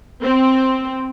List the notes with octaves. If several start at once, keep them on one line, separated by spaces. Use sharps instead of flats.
C4